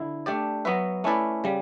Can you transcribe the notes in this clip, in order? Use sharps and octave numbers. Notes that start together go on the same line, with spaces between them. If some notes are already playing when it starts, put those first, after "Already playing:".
Already playing: D3 E4
A3 D4 G4 D5
F#3 B3 F#4 B4 E5
A3 C#4 E4 B4 D5
C#3 G3